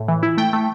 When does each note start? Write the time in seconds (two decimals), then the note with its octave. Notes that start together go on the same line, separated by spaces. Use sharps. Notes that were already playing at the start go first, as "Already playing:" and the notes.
Already playing: A2
0.08 E3
0.23 E4
0.37 A3 G5
0.53 A3